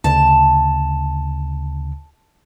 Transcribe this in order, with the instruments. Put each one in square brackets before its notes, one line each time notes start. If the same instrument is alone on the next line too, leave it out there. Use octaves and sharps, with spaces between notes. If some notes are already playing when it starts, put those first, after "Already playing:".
[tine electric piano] D2 C#3 [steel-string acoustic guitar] A5